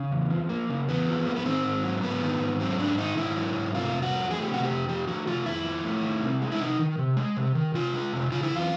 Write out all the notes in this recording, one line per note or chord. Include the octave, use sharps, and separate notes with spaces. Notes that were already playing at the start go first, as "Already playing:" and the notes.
Already playing: C#3
E2
F3
A#3
C#3
E2 B3
F3
A#3
B3
D#3 C4
G#2
F#3
G#2 B3
D#3
G#2
F#3 C4
G#2 D4
D#3 D#4
G#2 E4
F#3
G#2
C3 F4
F2
F#4
F3
A3 G#4
G4
C3 F#4
G4
F2
F3 G4
A3 F#4
C3 F4
F2 E4
F3
A3
D#3
C3
G#3
E4
C3 D#4
D#3
C3
G#3
C3
D#3
C3 F4
G#3
C3
C#3 F4
E4
E2 F4